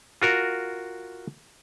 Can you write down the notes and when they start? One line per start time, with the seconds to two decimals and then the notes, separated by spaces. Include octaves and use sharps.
0.22 F4 F#4 A#4